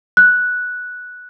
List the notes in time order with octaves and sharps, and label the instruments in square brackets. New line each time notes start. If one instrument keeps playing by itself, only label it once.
[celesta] F#6